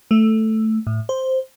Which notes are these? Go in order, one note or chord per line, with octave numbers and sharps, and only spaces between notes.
A3
A2
C5